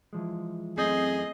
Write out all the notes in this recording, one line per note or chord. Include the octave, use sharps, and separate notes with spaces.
E3 F3 G#3
F#2 E3 A3 C4 G#4 D#5